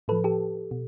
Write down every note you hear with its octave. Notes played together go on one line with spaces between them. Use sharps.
A2 F3 A4 B4
G4 A4
B2